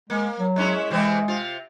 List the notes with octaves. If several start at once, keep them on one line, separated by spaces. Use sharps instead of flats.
G#3 A#3
F#3
G#3 C#4 E4
C3 E3 G#3 C4
C3 F4